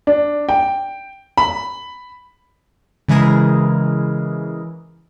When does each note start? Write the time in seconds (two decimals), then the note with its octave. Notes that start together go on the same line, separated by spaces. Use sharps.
0.07 D4
0.49 G5
1.37 B5
3.08 C#3 E3 G#3 E4 G#4 A#4